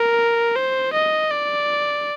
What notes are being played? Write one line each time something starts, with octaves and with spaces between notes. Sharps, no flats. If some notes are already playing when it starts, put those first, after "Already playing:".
Already playing: A#4
C5
D#5
D5